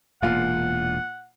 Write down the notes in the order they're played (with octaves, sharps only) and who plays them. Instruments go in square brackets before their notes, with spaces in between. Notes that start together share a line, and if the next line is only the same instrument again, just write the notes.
[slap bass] E1 E2 [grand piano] A#2 F4 F5 [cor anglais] F#5